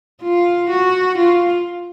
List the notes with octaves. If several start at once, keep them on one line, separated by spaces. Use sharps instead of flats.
F4
F#4
F4